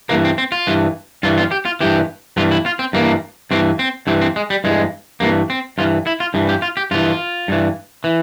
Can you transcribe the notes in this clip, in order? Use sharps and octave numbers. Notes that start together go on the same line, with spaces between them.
G2 E3 A#3
C4
C4
F4
G2 E3
G2 E3 F4
F4
G4
F4
G2 E3 G4
G2 E3 F4
E4
F4
C4
G2 E3 A#3
G2 E3 C4
C4
G2 E3 C4
C4
G#3
G3
G2 E3 G#3
G2 E3 A#3
C4
G2 E3 F4
E4
F4
G2 E3
G4
F4
G4
G2 E3 F4
G2 E3
E3